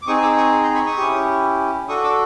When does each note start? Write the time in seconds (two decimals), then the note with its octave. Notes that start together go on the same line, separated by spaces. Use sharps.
0.02 D6
0.07 C4 D#4 G#4 C#6 D#6
0.22 D6 E6
0.37 C#6 D#6
0.63 A#5 C6
0.74 B5 C#6
0.86 C#6 D#6
0.97 C#4 E4 G4
1.88 D4 F#4 A4 C#6 D#6
2.04 D6 E6